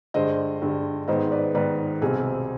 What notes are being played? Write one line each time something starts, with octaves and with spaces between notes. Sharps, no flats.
G2 D3 G#3 C5 D#5
G2 D3 G#3
G#2 D#3 B3 C5 D#5
B4 D5
G#2 D#3 B3 B4 D5
C2 B2 G3 C4 G#4